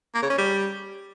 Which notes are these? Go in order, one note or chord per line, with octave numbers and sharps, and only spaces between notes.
A#3
C#3
C#4
G3